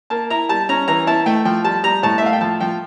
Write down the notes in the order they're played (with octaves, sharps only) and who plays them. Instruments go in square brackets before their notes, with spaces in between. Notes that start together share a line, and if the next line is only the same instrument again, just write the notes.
[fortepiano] A#3 A5
E4 A#5
G3 A5
C#4 A#5
E3 A#5
E4 A5
A3 G5
F3 G5
G3 A5
G3 A#5
A2 A5
E5
A3 F5
G5
F3 A5
F3 G5